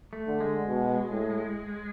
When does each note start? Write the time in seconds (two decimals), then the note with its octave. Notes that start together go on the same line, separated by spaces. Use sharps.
0.13 A3
0.27 D3
0.41 G#3
0.68 B2
1.11 A2